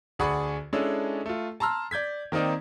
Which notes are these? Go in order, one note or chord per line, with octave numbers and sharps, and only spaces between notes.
D2 G#4 D5 F#5 B5 C#6
G#3 C#4 D4 E4 G#4 A4
A3 F4
A5 A#5 C6 E6 F6
D5 G6 G#6 B6
D#3 A#3 C4 D#4 D5